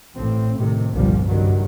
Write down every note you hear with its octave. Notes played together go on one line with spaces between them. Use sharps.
A1 A2 C4
A2 C3 D#3
G1 C2 A#2 F3 G3
F#1 G2 D#3 F#3